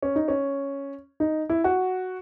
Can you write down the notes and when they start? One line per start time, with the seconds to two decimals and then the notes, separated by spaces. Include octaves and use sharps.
0.03 C#4
0.16 D#4
0.28 C#4
1.20 D#4
1.49 E4
1.64 F#4